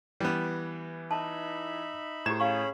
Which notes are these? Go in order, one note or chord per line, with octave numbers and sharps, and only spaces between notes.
E3 G3 B3
D#4 E5 A5 B5
A2 G4 C5 A#5 G#6 E7
C#4 G#4 F5 B5 C#6